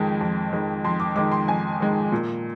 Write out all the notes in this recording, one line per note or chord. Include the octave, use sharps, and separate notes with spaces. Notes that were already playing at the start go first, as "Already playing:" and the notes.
Already playing: F2 D#3 G#3
F2
D#3 G#3
F2 C6
D6
D#3 G#3 D6
C6
F2 G#5
D#3 G#3
A#2